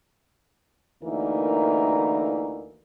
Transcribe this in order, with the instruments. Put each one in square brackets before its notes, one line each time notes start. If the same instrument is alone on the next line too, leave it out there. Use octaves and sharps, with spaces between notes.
[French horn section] D2 E3 A#3 D#4 A#4